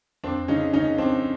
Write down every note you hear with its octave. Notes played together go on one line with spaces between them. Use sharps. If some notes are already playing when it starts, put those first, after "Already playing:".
F2 C4 D4
C#3 C#4 D#4
C#3 C#4 D#4
F3 C4 D4